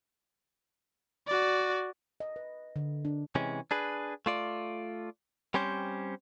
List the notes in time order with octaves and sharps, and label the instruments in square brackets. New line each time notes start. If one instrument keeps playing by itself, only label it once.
[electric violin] F#4 D5
[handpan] D#5
B4
D3
D4
[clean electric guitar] C3 E3 G#3 C#4
D4 G#4 B4
A3 F4 D5
G3 C4 C#4 G4 C5